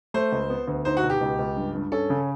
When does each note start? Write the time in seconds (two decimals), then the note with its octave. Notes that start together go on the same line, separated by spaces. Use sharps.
0.14 A3 C5
0.32 C#2
0.50 B3
0.68 D2
0.85 D#4 C5
0.97 F#4
1.03 B2
1.10 G4
1.21 C#2
1.39 C#2
1.57 G2
1.74 G2
1.92 C#4 A4
2.10 C#3